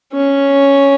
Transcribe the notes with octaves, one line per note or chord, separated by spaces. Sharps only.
C#4